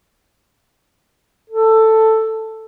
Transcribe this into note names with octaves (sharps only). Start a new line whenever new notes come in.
A4